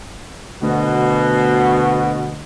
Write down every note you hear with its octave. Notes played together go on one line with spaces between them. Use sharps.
D2 B2 F#4